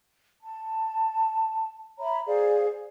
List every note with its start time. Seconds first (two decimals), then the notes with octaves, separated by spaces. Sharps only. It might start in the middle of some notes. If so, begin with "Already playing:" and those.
0.42 A5
2.00 C#5 E5 A#5 B5
2.26 G#4 C5 D5 F5